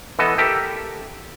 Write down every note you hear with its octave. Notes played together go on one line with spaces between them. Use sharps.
E3 B3 A4 D#5
G4 A4 A#4 E5